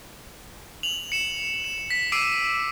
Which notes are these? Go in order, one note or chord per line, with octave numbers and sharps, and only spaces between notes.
F7 F#7
C#7 E7
E7
B6
D6 E6 C7 D7 D#7